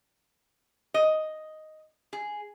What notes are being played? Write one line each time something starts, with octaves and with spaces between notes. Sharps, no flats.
D#5
G#4